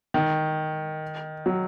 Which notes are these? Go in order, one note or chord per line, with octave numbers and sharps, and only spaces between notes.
D#3
F#3